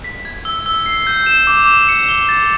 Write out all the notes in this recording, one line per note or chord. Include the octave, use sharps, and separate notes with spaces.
B6
G#6
E6
E6
C7
G6
E7
D6
E7
C#7
G7
A6